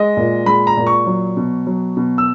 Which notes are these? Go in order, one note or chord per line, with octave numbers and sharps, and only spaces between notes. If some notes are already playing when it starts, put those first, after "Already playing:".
Already playing: G#3 D#5
A#2
G#3 B5
A#5
A#2
C#6
F#3
B2
F#3
B2
E6